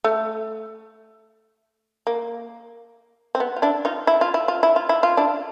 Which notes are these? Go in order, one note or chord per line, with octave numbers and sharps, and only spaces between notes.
A3
A#3
C4
B3
F4
D4 E4
D#4 F4
E4
F4
E4
F4
E4
F4
E4
F4
D4 E4